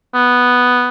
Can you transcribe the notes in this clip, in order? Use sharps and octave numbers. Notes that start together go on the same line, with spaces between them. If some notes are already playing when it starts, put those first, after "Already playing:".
B3